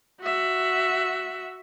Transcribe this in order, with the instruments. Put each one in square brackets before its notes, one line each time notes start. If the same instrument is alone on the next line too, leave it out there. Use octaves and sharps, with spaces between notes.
[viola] F#4 E5